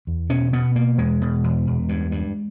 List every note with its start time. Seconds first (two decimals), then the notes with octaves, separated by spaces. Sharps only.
0.07 E2
0.29 B2 C#4
0.53 B2 B3
0.75 B2 A#3
0.98 E2 G#3
1.21 B2
1.44 E2
1.67 E2
1.89 G2
2.12 G2